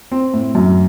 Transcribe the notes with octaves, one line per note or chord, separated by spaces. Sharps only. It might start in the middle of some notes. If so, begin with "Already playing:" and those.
C4
A2
F#2